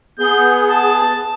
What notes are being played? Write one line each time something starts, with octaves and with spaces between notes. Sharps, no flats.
B3 G#4 G6
A5